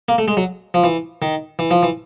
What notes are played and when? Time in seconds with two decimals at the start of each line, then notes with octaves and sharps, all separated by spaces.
0.09 A#3
0.18 A3
0.28 G#3
0.37 F#3
0.74 F3
0.84 E3
1.22 D#3
1.59 E3
1.71 F3
1.83 E3